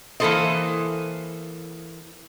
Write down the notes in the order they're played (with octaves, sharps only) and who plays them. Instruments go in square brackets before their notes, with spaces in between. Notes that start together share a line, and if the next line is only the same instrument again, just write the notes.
[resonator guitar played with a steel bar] E3 A#3 E4 A4 C5 D#5